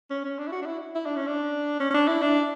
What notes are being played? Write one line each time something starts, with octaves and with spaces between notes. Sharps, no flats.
C#4
C#4
D4
E4
F#4
D4
E4
E4
D4
C#4
D4
C#4
C#4
D4
E4
D4